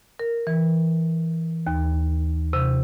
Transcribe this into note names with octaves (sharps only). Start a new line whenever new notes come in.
A#4
E3
D#2
C3